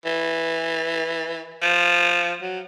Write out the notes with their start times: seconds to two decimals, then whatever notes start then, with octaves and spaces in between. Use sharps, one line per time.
0.05 E3
1.62 F3
2.42 F#3